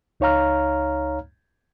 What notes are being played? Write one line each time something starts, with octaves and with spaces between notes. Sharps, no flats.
C#2 D#4 C#5 F5 A#5 F6